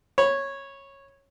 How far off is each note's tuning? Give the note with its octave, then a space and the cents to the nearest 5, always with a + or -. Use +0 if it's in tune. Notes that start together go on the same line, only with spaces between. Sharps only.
C#5 -10 B5 +0